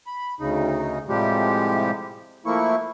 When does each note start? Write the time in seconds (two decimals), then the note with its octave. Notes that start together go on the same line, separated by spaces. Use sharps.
0.07 B5
0.40 D2 C#3 D#4
1.08 A2 C3 F3 G3 G#3 G4
2.46 F3 A3 A#3 E4 C#6